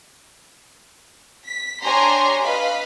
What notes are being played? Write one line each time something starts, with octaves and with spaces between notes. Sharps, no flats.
B6
D4 G4 C#5 G#5 A#5 C6
B4 D#5 F5 B5